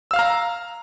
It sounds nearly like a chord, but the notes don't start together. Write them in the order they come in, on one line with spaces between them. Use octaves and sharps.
E6 F5 F6 A#5